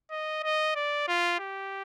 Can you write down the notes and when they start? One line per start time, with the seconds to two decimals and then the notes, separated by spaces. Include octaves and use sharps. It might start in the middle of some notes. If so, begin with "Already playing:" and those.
0.11 D#5
0.43 D#5
0.75 D5
1.08 F4
1.40 G4